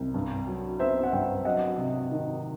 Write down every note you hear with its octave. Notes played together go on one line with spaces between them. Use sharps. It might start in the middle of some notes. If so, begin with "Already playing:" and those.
Already playing: C2
G2
F#3
B3 C5 E5
F#5
G2 E5 G5
F#3 D#5 F#5
C3
D#3